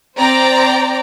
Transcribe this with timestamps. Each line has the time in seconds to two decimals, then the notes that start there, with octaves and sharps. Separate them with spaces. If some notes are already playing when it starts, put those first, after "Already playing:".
0.18 C4 C5 D5 G5 A#5